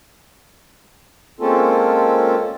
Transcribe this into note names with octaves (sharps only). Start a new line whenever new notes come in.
G#3 A#3 C4 C#4 F4 A4